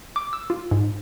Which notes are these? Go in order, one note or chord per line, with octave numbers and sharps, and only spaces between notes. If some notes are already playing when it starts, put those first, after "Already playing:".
D6
E6
F4
G#2